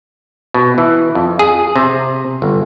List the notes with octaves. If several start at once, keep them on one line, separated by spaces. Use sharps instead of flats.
B2
E3
F2
G#4
C3
G1